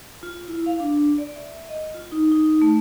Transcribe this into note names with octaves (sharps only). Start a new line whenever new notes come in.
F4
E4
F5
D4
D5
E5
D#5
F4
D#4
D#4
D#4
A3